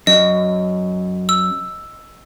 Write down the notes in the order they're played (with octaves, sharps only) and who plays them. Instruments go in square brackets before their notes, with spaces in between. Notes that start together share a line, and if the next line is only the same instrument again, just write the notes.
[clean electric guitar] F#2 [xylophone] D#5
[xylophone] E6